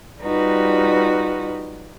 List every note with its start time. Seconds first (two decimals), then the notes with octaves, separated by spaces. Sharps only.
0.21 G3 D#4 F4 F#4 B4